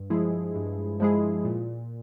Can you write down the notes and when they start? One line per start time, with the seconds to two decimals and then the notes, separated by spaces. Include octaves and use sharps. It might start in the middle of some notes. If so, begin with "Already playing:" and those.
Already playing: G2
0.10 F3 G#3 E4 G#4
0.55 G2
1.00 F3 G#3 E4 G#4
1.45 A#2